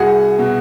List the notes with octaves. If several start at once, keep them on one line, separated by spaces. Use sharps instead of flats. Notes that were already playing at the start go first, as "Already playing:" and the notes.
Already playing: C2 F#4 G#4
B2